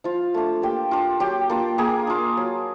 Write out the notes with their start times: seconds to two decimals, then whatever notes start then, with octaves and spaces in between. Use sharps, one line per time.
0.04 F3 F4 F5
0.34 A3 D4
0.62 A#3 G4 G5
0.91 D4 F4
1.20 F#3 G4 G5
1.50 A#3 D4 F4
1.78 A#3 G#4 G#5
2.07 D4 F4
2.37 F#3